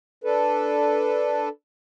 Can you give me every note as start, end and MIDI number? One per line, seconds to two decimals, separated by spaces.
0.24 1.49 62
0.24 1.49 69
0.24 1.49 71